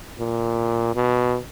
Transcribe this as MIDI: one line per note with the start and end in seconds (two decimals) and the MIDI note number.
0.20 0.92 46
0.96 1.38 47